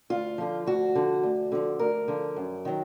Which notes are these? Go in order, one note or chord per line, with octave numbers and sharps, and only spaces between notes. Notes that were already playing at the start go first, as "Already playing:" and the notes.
D2 F4
D3 F3
D2 F#4
D3 F3
D2
D3 F3
D2 A#4
D3 F3
F#2
D#3 F#3